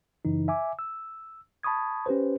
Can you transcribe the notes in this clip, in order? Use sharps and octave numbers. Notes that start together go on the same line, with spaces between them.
F#2 C#3 E3 D#4
E5 G#5 D6
E6
A5 B5 C#6 D#6 G#6
C#4 G4 B4 C5